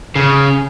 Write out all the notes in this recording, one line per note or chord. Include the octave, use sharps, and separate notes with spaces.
C#3